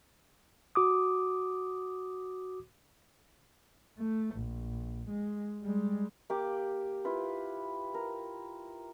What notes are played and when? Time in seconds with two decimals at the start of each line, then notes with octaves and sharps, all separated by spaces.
0.75 F#4 D6 D#6
3.98 A3
4.36 A#1
5.09 G#3
5.62 G3 G#3
6.30 A#3 G4 D6
7.05 E4 F4 B4
7.94 A#4